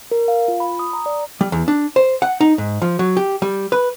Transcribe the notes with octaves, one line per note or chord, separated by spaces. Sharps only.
A#4
F5
F4
B5
D#6
A#5
D5
G3
E2
D4
C5
F#5
D#4
G#2
F3
F#3
G4
G3
B4